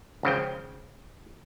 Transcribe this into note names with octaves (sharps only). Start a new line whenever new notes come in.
G#1 C#3 F3 G5